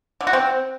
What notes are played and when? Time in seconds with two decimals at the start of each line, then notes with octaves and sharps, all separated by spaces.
0.21 D3
0.27 F#4
0.33 C4